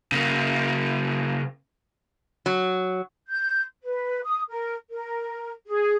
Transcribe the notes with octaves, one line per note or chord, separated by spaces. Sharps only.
C#3 A#3
F#3
G6
B4
D#6
A#4
A#4
G#4